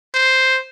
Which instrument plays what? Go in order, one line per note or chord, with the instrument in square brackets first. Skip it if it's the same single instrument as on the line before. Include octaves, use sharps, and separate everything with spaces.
[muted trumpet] C5